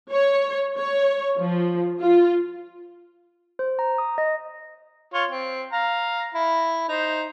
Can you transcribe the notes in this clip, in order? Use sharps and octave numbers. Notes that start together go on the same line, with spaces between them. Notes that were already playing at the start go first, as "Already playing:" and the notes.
C#5
C#5
F3
F4
C5
A#5
D#6
D#5
F4 C#5
C4
F5 A#5
E4
D#4 C5